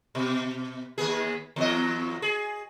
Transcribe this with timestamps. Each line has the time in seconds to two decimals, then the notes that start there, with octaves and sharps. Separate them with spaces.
0.15 B2
0.98 D#2 B3 G#4
1.56 E2 F#3 D#5
2.22 G#4